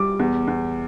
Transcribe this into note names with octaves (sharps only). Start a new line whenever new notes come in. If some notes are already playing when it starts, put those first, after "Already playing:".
Already playing: G3 D6
E2
E2